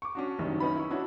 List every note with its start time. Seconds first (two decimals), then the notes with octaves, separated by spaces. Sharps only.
0.02 C#6 D6
0.15 C#4 D4 F#4
0.39 F#1 C2 D#3 F#3
0.60 C#4 D#4 B4 B5
0.76 E4 C#6
0.90 D4 E4 F#4 C#5